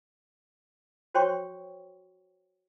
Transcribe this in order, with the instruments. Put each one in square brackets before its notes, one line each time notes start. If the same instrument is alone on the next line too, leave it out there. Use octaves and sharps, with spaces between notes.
[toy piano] F#4 C5 C#5 G5 C6 C#6